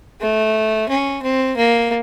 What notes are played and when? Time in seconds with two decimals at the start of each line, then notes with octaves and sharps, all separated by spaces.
0.21 A3
0.89 C#4
1.23 C4
1.57 A#3